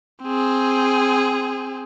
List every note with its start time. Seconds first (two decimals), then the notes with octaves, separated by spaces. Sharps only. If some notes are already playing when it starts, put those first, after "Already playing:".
0.23 C4 G#4